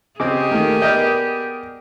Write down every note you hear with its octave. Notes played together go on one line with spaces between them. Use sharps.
C#3 C4 G4 G#4 D#5 G#5 D6
D#3 A3 A#3
B3 A#4 D5 D#5 G6